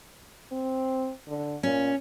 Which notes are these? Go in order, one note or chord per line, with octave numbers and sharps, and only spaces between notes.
C4
D3
A#2 C#4